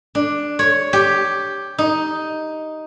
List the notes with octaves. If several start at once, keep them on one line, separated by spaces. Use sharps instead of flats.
D4
C#5
G4
D#4